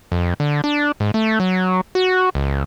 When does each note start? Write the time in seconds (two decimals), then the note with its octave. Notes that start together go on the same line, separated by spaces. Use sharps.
0.12 F2
0.40 D3
0.64 D4
1.00 G#2
1.14 A3
1.40 F#3
1.95 F#4
2.35 C#2